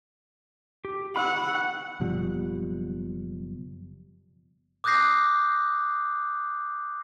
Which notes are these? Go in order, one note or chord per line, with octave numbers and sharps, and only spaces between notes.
G4
F#5 B5 C#6 E6
F#1 B2 F3 G3
D6 D#6 F#6 G6 A#6 C7